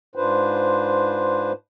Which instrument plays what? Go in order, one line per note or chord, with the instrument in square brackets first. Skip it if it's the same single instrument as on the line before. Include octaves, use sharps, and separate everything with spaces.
[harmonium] G#2 D4 F4 B4 C5